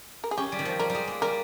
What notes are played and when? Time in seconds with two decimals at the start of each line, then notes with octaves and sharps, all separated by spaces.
0.24 A#4
0.31 G#4
0.37 C#4 G4
0.52 G3
0.59 D#3
0.65 F3
0.79 G3 A#4
0.90 G3
0.95 G#3
1.07 A#3
1.22 G3 A#4